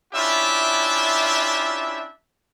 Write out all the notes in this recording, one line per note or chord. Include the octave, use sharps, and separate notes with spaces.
C#4 D4 E4 F4 G4 E5